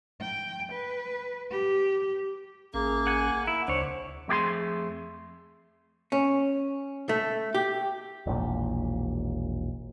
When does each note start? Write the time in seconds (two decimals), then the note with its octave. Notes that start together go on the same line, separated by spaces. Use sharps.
0.22 G5
0.72 B4
1.51 G4
2.74 A1 A#3 C#4 G#4
3.07 F#5 G#5
3.47 E4 F#5
3.68 D2 C#3 D4 C5 C#5
4.28 F2 A3 G4 G#4 C6
6.12 C#4
7.09 A3
7.55 G4
8.26 E1 A#1 A#2